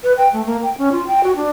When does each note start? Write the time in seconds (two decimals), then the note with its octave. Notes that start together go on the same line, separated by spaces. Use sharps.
0.03 B4
0.17 G5
0.33 A3
0.46 A#3
0.63 G5
0.78 C#4
0.92 F4
1.07 G5
1.23 F#4
1.36 D4